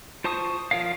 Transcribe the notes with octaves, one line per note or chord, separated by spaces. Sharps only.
F4 C5 A5 C#6 D#6
F3 F4 A#4 C#5 F5